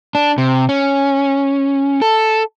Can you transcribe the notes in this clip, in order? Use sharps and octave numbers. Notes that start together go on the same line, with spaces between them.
D4
C3
C#4
A4